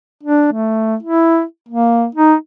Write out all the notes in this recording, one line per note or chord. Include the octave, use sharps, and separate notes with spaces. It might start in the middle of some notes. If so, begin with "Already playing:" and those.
D4
A3
E4
A#3
D#4